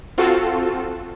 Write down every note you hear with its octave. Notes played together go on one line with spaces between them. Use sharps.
C4 F4 F#4 A4